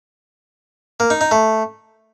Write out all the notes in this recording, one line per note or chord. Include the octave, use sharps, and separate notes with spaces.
A#3
D#4
D#4
A3